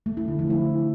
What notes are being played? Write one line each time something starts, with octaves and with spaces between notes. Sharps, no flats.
A3
E4
D3
F3
E4